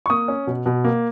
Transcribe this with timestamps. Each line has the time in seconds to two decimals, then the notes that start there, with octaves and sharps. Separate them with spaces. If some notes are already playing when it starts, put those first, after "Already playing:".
0.06 C#6
0.10 A#3 D#6
0.28 C#4
0.47 B2
0.66 B2
0.84 A#3